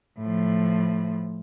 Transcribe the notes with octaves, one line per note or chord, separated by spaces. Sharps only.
A2 F3